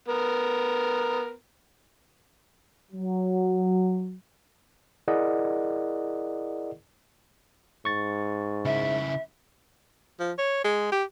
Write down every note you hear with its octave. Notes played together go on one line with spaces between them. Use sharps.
B3 A#4
F#3
E4 G#4 A#4 D5 D#5 F#5
G#2 C#6 A6
C#3 E4 E5
F3
C#5
G#3
G4